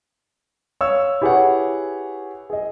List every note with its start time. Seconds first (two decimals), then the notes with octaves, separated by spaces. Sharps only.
0.81 C#5 F5 E6
1.22 E4 G4 G#4 B4 C#5 F#5
2.50 G#4 D#5